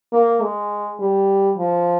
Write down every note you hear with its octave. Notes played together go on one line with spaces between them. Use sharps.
A#3
G#3
G3
F3